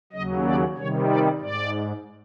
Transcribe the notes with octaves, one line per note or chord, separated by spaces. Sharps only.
D#2 C#3 F#3 D#5
D5
C3 D#3 G3 C#5
D5
G#2 D5